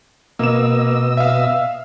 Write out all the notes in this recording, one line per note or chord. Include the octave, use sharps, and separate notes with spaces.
B2 A#3 D#5 E6 E7
E5 F5